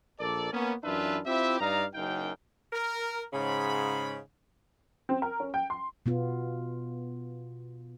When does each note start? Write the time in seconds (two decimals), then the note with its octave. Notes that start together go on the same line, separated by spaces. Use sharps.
0.20 A#1 A4 A#4 D5
0.52 A#3 B3 C#4
0.84 F#2 E3 D4 F4 B4 E5
1.26 C4 E4 F4 G4 E5
1.60 G2 D#4 D5 F5 A#5
1.95 F#1 F#2 D#4 F5 G5
2.73 A#4
3.33 G#2 C#3 B5
5.09 C4
5.22 A#4
5.40 C#4
5.54 G5
5.70 C6
6.06 B2 B3 F4